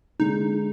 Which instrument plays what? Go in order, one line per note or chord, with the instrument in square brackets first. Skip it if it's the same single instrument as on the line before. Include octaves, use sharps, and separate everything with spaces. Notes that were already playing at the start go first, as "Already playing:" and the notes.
[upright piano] D3 G#3 D4 [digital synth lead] D#4